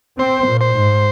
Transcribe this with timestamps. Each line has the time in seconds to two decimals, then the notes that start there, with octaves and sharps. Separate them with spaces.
0.19 C4 C5
0.47 A#2
0.61 C5
0.75 G#2